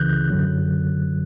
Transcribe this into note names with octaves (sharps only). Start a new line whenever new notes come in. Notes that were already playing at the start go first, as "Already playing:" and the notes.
Already playing: C#2 C#3 E3 F#6 G6
F#2 D3 F#3